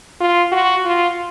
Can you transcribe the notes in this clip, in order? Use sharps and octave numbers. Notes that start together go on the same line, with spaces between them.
F4
F#4
F4